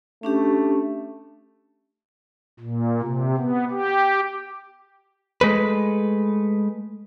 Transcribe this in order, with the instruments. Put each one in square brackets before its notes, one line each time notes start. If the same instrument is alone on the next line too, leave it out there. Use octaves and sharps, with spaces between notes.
[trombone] A3 [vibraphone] C#4 D4 G4
[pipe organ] A#2
C3
B3
G4
[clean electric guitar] G#3 A3 B4